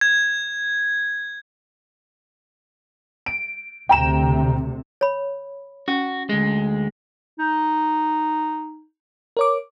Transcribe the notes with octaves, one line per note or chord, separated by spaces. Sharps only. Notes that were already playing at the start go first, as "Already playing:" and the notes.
G#6
D7
D2 C3 G5 A#5 E7
C#5 B5
C#4 F#4
D2 G#3
D#4
A#4 C#5 D6